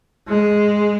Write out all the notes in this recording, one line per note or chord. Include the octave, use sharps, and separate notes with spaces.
G#3